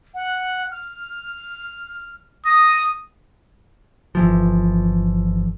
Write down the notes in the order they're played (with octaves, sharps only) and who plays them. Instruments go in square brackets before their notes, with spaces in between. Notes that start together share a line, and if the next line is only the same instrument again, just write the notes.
[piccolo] F#5
F6
[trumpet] D#6 [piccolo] A#6
[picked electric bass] G1 E3 F3